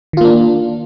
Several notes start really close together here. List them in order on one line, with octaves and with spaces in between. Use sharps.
D#3 F4 A#3 D4